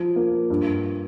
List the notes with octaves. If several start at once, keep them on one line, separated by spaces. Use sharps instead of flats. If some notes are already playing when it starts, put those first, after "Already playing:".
Already playing: F3
A#3
G2